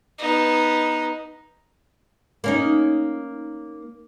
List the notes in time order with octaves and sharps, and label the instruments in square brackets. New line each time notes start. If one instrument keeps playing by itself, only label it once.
[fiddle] B3 D#4
[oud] A#3 C#4 D#4